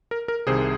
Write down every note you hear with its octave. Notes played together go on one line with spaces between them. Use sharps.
A#4
A#4
C2 C3 D#3 G#4 C5